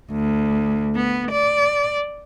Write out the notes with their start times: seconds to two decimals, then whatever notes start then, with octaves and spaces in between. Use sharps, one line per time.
0.11 D2
0.95 B3
1.31 D5